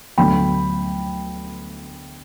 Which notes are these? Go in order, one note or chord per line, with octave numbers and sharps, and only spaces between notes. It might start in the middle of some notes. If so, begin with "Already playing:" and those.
D2 D3 F#3 B3 D4 G5 B5